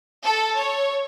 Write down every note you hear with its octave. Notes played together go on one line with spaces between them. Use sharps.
A4
C#5